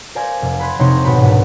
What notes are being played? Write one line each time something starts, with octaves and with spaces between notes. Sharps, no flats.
A#4 C5 D5 F5 G#5
F1
B5 C6 F#6 G#6 C7
F1 C3 D#4 G4 C#5 C6
G#1 B2 F#4 B5 C#7
E1 C2 G#2